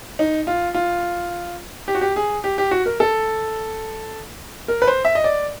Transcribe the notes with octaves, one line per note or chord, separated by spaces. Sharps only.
D#4
F4
F4
G4
F#4
G4
G#4
G4
G4
F#4
A#4
A4
A#4
B4
C5
E5
D#5
D5